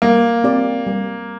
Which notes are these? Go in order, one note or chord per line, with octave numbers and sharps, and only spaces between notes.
G3 A#3
C4 G4 D5
G3